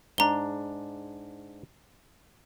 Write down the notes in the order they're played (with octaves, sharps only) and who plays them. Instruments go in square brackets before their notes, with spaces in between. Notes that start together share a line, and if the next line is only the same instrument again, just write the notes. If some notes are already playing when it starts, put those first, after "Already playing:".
[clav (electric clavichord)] G#2 D4 [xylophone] A#5 G7